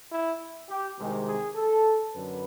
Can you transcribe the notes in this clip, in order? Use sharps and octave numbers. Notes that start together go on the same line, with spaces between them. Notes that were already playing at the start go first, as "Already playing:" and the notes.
E4
G4
C2 C3 D#3 G#3 C4
G#4
A4
F#2 D3 F#3 B4